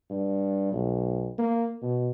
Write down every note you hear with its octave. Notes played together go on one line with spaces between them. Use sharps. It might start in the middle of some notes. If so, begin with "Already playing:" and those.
G2
B1
A#3
B2